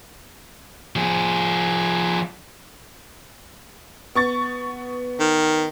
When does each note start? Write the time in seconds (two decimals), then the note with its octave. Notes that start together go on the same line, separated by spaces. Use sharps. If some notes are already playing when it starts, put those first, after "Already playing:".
0.96 F3 G#4
4.15 B3 C#6 A6
5.20 D#3